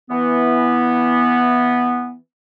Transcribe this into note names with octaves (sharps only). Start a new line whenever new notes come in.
E3 B3